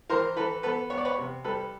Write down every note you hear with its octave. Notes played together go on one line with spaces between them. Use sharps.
E3 A#4 C5
E3 A4 B4
B3 A4 B4
B3 C#5
D5
B4 C#5
C3
G3 A4 B4